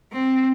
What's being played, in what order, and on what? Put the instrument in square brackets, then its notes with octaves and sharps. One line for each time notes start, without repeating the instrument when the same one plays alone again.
[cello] C4